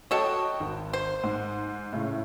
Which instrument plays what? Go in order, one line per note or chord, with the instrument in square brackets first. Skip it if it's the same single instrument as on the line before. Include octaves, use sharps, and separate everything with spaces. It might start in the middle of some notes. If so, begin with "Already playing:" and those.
[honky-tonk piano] F#4 D#5 G5 [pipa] A4 C#5
[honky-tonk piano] G#1
[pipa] C5
[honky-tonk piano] G#2
A2 C#3